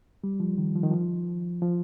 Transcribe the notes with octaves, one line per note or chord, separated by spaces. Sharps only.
G3
F3
D#3
F3
D#3
F3
F3